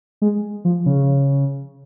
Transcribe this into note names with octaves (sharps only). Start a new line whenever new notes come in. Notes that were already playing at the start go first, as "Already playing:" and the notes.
G#3
F3
C#3